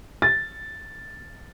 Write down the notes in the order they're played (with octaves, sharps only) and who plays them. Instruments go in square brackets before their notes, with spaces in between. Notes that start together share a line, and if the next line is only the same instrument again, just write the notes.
[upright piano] A6